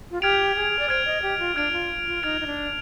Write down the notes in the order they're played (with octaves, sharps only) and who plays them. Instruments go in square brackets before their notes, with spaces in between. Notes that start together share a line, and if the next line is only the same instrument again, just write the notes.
[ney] F4
[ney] G4 [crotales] F6 G#6 D7 F7
[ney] G#4
D5
[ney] C5 [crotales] F6 G#6 D7 F7
[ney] D#5
G4
F4
[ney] D4 [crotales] F6 G#6 D7 F7
[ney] F4
F4
[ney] D#4 [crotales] F6 G#6 D7 F7
[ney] D#4
D4